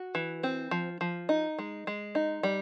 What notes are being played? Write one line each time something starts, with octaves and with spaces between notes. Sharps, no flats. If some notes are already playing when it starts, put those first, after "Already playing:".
Already playing: F#4
E3
C4
F3
F3
D#4
G#3
G#3
D#4
G3